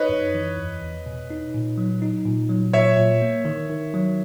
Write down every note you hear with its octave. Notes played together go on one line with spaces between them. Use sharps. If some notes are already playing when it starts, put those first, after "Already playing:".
Already playing: D#4 B4 C#5 D#5
F#2
E3
E2
E2
B2
D#4
A#2
F#3
D#4
A#2
F#3
A#2 C#5 E5
A#2
A#3
D#3
D#3
F#3